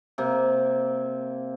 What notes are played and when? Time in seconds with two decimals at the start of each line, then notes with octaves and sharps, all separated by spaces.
0.18 C3 A#3